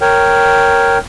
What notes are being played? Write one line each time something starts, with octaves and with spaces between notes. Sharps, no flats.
A#4 C#5 G5